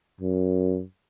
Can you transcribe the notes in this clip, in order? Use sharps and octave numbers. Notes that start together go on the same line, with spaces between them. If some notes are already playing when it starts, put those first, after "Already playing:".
F#2